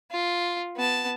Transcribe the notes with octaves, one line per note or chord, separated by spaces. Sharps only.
F4
B3 A5